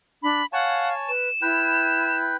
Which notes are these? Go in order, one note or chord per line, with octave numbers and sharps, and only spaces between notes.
D4 B5
C#5 F5 F#5 G#5 A5
B4 E7
E4 B4 G5